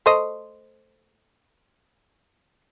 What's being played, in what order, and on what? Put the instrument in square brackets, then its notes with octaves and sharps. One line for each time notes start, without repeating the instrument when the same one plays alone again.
[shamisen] A3 C5 D#5